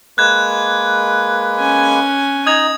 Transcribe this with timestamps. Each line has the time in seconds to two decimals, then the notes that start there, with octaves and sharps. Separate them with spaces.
0.18 G#3 A#3 B4 F#6 G#6
1.59 C#4 G#5
2.47 D#4 D#5 D#6 G#6 F7